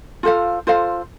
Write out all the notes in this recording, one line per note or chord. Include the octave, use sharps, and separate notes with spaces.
F4 A4 C5 F5
F4 A4 C5 F5